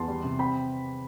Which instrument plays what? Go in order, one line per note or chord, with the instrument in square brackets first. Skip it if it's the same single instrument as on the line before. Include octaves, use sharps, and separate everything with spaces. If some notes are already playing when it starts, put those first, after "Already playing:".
Already playing: [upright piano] E2 A5 C6
G3
C3
C4 G5 B5